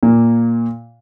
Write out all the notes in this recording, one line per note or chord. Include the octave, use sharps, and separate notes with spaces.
A#2 A#3